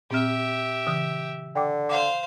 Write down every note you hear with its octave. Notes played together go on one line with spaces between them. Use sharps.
A#2 C4 G4 E5 F6
C#3 E3 D#6
D3 G5 D6
C5 F5 F#5 D6